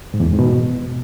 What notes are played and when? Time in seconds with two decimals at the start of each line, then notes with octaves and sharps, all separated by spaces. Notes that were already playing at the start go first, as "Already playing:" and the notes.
0.14 G#2
0.20 E2
0.26 F2
0.32 G#2
0.39 B2